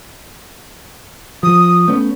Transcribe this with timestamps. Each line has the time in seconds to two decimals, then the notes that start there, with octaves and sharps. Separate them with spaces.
1.43 F3 D#6
1.88 A3 B3 C#4